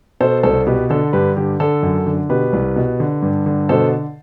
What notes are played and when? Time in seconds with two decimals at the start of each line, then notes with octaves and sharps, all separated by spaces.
0.20 B2 A4 C5
0.43 C2 A4 C5
0.67 B2 G4 B4
0.90 D3 A4
1.13 G2 G4 B4
1.37 D3 G4
1.60 D3 A4
1.83 F#2
2.06 D3
2.29 B2 G4 B4
2.53 C2
2.76 B2
3.00 D3
3.22 G2
3.46 D3
3.69 B2 A4 C5